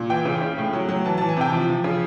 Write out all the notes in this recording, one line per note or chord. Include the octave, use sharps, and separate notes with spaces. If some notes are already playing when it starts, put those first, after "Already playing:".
Already playing: A#2
E3 G5
C#3
C#3
A2
F#3
F#3
E3 A5
E3 A5
G#5
C3 G5
F3
F3
C#3